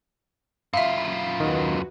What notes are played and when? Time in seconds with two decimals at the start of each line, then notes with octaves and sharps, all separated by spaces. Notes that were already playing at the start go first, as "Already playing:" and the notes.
0.74 F#2 F4 E5 F5 B5
1.40 D#2 D#3 F#4 B4